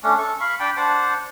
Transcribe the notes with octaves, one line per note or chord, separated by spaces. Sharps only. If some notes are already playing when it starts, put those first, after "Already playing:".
A3 C#4 D4
A4 C#6
F5 B5 C#6
D4 G5 A5 B5
D4 C5 F#5 A5